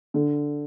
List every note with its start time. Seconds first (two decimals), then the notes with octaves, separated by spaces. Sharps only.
0.14 D3